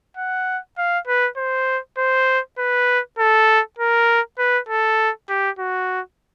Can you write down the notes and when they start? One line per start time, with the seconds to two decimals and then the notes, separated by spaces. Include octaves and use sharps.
0.17 F#5
0.77 F5
1.07 B4
1.37 C5
1.97 C5
2.58 B4
3.18 A4
3.79 A#4
4.38 B4
4.68 A4
5.29 G4
5.58 F#4